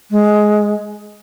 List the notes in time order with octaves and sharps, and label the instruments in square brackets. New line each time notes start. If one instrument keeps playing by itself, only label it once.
[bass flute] G#3